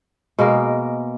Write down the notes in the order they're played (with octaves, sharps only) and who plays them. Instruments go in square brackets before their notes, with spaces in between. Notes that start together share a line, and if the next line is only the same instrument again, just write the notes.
[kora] B2 G#3 A#3 A#4